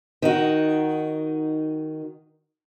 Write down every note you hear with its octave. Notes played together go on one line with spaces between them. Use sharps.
D#3 D#4 F#4